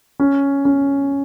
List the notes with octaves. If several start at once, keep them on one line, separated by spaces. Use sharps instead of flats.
C#4
C#4